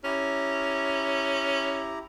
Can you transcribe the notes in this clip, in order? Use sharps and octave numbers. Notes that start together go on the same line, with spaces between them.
C#4 E4 G4 A#5